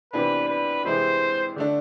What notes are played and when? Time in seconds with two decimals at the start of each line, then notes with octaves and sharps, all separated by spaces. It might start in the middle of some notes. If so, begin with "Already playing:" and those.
0.13 C3 E3 B3 D4 B4
0.48 B4
0.84 C3 E3 G#3 C4 E4 C5
1.56 D3 A3 D4